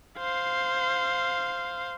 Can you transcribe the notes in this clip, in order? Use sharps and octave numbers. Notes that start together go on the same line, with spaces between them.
C5 F5